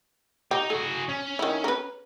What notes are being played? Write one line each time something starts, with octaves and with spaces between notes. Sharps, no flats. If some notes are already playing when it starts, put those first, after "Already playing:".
D#4 G4
F#4 G#4 A4
C#4
D#3 E4
A#4 B4